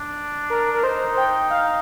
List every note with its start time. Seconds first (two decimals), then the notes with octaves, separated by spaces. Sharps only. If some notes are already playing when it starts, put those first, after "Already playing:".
Already playing: D4
0.50 A#4
0.74 A#4
0.83 D#4 C5
1.17 G5
1.50 F5